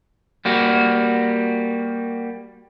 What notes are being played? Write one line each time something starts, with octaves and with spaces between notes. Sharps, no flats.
G3 A#3 F#4